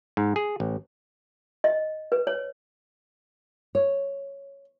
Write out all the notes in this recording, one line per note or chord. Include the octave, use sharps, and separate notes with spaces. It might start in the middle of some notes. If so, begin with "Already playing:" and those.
G#2
G#4
A1
D#5
B4
C#5
C#5